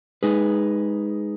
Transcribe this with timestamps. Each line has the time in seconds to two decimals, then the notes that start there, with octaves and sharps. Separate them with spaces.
0.23 G#3 D#4 G#4 B4